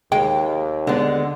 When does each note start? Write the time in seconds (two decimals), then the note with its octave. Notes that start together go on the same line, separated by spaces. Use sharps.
0.12 D#2 G#3 G5
0.87 D3 G#3 B3